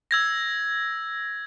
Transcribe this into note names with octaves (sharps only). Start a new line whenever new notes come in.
E6 G#6 A#6